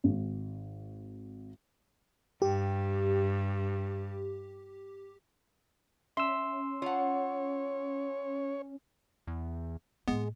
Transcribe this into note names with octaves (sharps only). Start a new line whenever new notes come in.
G#1
G2 G4
C#4 E5 C6 E6
F4 C#5 F#5
E2
A2 G#3 A#3 B3